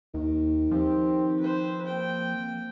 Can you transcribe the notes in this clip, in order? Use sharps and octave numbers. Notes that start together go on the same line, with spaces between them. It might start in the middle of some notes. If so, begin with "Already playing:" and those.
D#2 D#3
F3 C4 G4
C4 B4 C5
A#3 G5